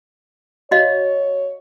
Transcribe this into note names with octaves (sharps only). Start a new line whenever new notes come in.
F#4 C#5 D#5 F5